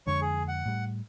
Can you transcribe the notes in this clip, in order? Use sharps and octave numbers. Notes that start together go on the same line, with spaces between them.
F2 D3 G#3 C#5 C#6
G#4
F#5
A2 G3